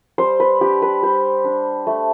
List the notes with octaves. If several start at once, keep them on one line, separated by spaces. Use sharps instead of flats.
G3 C5
B4
D4 G4
B4
G3 C5
D4
A3